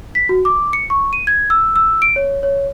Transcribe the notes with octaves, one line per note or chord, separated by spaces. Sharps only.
B6
F#4
D6
C#7
C#6
D#7
G#6
E6
E6
D7
C#5
C#5